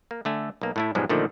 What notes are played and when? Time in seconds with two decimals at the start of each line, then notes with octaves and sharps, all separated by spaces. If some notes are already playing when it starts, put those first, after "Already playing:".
0.11 A#3
0.25 D3 A3 G#5
0.62 B1 A#3
0.76 A2 A3 E4
0.95 B1 G#2 F3 G3 G#3
1.09 A#2 D3 D#3 F3 A3